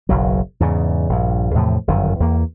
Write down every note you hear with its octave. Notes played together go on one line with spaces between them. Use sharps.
F#1 B1 F#3
E2 G#2 C#3
A#1 G2
E2 A2 C3 F3
G1 F#2 D#3
E2 A#3